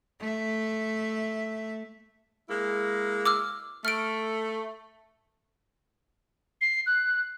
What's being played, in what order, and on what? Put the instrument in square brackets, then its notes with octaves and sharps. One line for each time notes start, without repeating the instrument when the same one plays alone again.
[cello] A3 E5
[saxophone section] G#3 A#3 E4
[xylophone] D6 E6 F6
[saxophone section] A3 [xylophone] F6 D7
[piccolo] C7
F#6